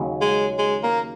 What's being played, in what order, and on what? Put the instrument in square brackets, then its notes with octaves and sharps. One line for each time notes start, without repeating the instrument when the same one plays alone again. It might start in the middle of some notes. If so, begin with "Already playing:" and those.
Already playing: [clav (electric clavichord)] D#2 C#3 F#3 C#4
[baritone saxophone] G#3
G#3
A#3